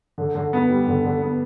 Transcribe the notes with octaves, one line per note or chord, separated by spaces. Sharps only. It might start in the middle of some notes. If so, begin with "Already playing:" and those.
D3
D3
B3
G3
D3
D3
B3